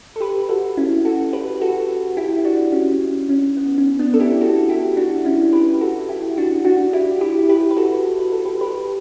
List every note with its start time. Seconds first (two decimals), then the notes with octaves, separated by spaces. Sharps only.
0.16 A4
0.21 G4 B4
0.49 F#4 A4
0.77 C#4 E4
1.05 F#4 A4
1.33 G4 B4
1.61 F#4 A4
2.17 E4 G4
2.44 D4 F#4
2.72 C#4
3.29 C#4
3.57 B3
3.78 C#4
3.99 B3 D4
4.14 A4
4.20 E4 G4
4.41 F#4 A4
4.69 E4 G4
4.97 D4 F#4
5.25 C#4 E4
5.53 G4 B4
5.81 F#4 A4
6.09 E4 G4
6.37 D4 F#4
6.65 D4 F#4
6.93 E4 G4
7.21 E4 G4
7.49 G4 B4
7.71 B4
7.77 F#4 A4
8.19 B4
8.32 A4
8.45 G4 B4
8.61 G4 B4